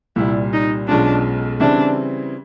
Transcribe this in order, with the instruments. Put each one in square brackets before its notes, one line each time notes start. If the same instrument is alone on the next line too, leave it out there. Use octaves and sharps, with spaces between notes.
[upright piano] C2 A#2 G3 [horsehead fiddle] E4
[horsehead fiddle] D#4
[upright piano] B1 B2 G#3 C#4 F4 [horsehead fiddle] D4
[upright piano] C#3 E3 G3 C4 E4 [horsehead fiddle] D4